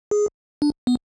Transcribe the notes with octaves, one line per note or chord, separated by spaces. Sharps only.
G#4
D4
B3